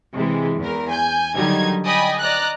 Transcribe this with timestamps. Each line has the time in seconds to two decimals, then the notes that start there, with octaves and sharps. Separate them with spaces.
0.13 C3 E3 G#3
0.57 E2 A#4
0.89 G#5 G6
1.36 D3 D#3 F#3 G3 D#4 G#6
1.86 D5 D#5 G5 G#5 B5 D#6
2.20 D5 D#5 A#5 F#6